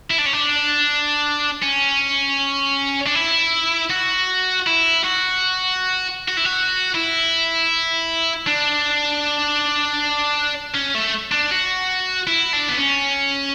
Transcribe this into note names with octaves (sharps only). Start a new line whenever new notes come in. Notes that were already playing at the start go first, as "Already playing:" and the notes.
E4
D4
C#4
D4
C#4
D4
E4
F#4
E4
F#4
F#4
E4
F#4
E4
D4
C#4
A3
D4
F#4
E4
D4
B3
C#4